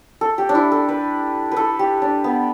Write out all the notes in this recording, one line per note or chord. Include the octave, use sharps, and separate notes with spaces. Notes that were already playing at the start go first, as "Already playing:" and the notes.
A4
G4
D4
E4
A4
B4
A4 B4
G4
D4
B3